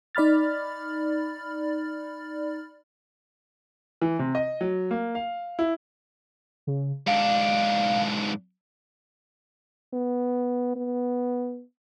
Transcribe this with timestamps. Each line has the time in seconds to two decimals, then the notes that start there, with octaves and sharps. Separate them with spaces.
0.15 D#4 D5 B5 F6 A6
4.02 E3
4.19 C3
4.35 D#5
4.61 F#3
4.91 A#3
5.15 F5
5.59 E4
6.67 C#3
7.07 G#2 D4 F5
9.94 B3
10.76 B3